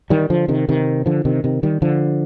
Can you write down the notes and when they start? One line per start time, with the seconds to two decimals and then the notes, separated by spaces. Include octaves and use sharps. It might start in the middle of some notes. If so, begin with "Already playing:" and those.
0.10 D#3 G3
0.30 D3 F3
0.48 C3 D#3
0.69 C3 D#3
1.06 D3 F3
1.25 C3 D#3
1.44 C3 D#3
1.63 D#3 G3
1.82 D3 F3